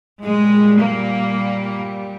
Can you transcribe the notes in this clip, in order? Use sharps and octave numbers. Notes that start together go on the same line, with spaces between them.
A#2 G3 G#3
A#3